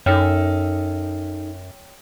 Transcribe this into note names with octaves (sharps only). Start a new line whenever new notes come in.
F#2 D#4 A4 C#5 E5 G5 F6